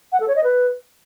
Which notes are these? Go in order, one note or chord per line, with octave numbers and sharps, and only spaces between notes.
F#5
A4
C#5
D#5
B4